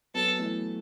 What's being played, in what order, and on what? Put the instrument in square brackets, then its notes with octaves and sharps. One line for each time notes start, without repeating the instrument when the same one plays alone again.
[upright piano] F#3 B3 [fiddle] A4
[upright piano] E3 A3